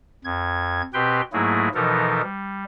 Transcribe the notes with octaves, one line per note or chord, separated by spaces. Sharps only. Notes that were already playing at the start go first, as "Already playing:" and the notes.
F2 G#6
B2 C4 G4 B4 G5 C6
G#2 F#3 A3 A#3 E4 G#4
B2 E3 F3 D#4 A4 A#4
G3